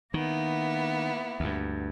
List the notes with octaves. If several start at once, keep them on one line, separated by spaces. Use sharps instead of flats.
D#3 A#3 B3 E4
D2 G2